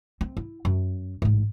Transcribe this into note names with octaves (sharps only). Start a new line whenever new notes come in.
C4
E4
F#2
A1 G#2